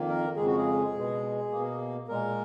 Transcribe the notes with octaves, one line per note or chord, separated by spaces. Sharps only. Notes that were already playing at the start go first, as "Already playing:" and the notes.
Already playing: F2 D#3 A#3
A#4
F2 C#3 G#3 G#4
F#4
G#4
B2 G#3
B2 A#3
A#2 G#3 A#4